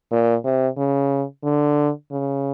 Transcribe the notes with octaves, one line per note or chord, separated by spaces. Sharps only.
A#2
C3
C#3
D3
C#3